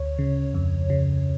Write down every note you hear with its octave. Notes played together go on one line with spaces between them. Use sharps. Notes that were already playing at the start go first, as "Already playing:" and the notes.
Already playing: D2 C#5
C#3
F2
C#3